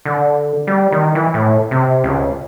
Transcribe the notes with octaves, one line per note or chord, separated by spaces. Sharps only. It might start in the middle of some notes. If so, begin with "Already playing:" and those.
D3
G3
D#3
E3
A2
C3
C#2